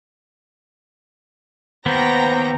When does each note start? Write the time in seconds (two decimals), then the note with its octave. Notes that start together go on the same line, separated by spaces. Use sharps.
1.86 D#2 B3 C5 G5 A#5 A#6